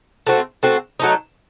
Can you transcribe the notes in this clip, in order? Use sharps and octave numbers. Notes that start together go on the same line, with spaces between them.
A3 C4 F#4
A3 C4 F#4
F#3 A3 D#4